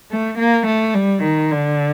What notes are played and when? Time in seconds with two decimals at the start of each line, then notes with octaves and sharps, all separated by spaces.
0.11 A3
0.39 A#3
0.67 A3
0.94 G3
1.23 D#3
1.51 D3